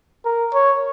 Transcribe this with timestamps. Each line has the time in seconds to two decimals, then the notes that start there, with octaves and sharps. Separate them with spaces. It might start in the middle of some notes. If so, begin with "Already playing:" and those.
0.25 A#4
0.54 C#5